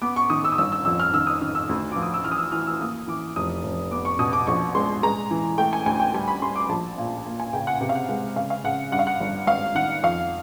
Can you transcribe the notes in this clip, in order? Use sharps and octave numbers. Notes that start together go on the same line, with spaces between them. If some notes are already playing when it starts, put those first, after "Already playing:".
B3 D6
C#6
D#3 D#6
E6
D#6
G1 E6
E6
F2 E6
F6
D#3 E6
D#6
D#3 F6
E6
D2
F3 D6
D#6
E6
E3 F6
D#6
E6
E3 F6
E6
A#3 D#6
E3 D6
F1 D#6
F1
B3 D6
C#6
B2 D#6
D6
A#1 C#6
G#3 C6
G#3 A#5
E3
A3 G5
G#5
D2 G#5
G5
G3 G#5
B5
G3 C6
D6
A#1 A5
A#2
A#3
G#5
C#3 G5
F#5
C3
F5
F#5
G#3 F#5
C#3 F5
F5
C#3 F#5
G2 F#5
F5
F#5
G1
G#1 F5
D#3 F#5
F2 F5